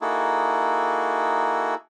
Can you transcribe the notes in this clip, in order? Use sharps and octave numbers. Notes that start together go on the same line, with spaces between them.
A#3 D#4 E4 F#4 G#4 A4